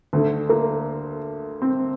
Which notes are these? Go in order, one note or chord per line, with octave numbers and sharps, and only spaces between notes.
D2 D3 A3
A#3
C4